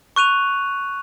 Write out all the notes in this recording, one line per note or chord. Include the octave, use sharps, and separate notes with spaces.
C#6 F#6 D#7 F7